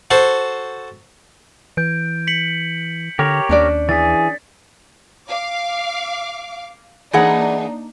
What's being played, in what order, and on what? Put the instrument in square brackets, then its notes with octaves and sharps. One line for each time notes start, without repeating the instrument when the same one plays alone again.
[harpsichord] F#4 A4 C5
[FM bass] E3 [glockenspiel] G6 D7
[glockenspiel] B6 C#7 F#7
[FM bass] D3 [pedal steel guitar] G4 A#4 C#5
[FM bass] D#2 [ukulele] C#4 D4 D5
[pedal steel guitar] E3 G#4 [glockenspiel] A6 B6
[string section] F5 D6
[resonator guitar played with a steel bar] E3 G#4 F#5 [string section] A#3 D4 D#4